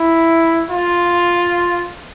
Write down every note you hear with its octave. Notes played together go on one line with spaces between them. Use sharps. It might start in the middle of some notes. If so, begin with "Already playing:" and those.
Already playing: E4
F4